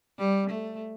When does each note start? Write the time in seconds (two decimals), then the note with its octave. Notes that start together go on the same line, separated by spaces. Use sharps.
0.19 G3
0.50 A3